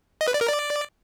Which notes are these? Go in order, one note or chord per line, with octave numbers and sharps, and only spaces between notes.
D#5
B4
D5
A#4
D5